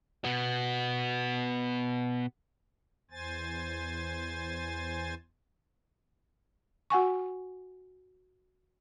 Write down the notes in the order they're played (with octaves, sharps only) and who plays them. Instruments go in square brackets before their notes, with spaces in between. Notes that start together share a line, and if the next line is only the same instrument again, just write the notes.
[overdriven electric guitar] B2 B3
[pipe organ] E2 C5 G#5 A6
[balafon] F#4 F#5 G#5 C#6